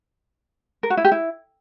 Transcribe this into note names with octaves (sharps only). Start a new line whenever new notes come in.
A#4
F#4
E4
G4
E4